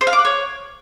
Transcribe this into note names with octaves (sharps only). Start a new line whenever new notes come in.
C5
F5
D6
F#5
C#5